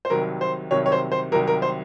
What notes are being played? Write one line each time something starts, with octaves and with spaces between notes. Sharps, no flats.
C5
C2 C3 D#3 F#3 A#4
C5
C2 C3 D#3 F#3 C#5
C#5
C5
C5
C2 C3 D#3 F#3 A#4
A#4
C5